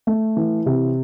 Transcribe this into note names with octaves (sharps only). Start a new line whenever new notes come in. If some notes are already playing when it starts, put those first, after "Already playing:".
A3
E3
C3